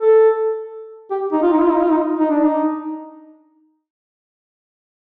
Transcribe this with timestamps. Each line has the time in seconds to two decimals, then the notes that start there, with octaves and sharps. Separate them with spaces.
0.01 A4
1.11 G4
1.32 D#4
1.43 F4
1.53 D#4
1.61 F4
1.72 D#4
1.81 F4
1.91 D#4
2.19 D#4
2.30 D4
2.43 D#4